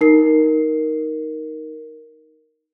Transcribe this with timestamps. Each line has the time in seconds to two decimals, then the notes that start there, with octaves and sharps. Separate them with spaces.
0.01 D#4 A#4 C7